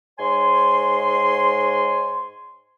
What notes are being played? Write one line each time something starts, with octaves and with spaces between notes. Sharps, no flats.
G#2 C#5 G#5 C6